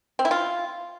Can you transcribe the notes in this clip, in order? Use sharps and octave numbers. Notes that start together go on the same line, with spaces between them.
C4
E4
F4